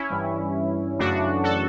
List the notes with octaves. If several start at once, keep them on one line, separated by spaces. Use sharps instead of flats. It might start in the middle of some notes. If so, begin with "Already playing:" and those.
Already playing: C#4 E4
G2 E3 G3
F#2 C#3 E3 A3 D4 F#4
F#4 A4